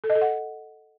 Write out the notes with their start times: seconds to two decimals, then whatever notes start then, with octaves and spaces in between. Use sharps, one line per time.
0.04 A4
0.10 D#5
0.15 A4
0.21 F#5